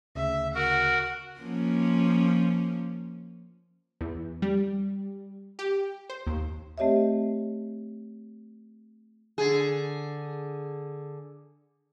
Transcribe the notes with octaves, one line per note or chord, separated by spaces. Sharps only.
D2 C#3 E5
F#4 A#4 F#5
F3 A#3 C#4
E2
G3
G4
C5
D#2
A3 C4 G4 C#5 D#5 E5
D3 G#4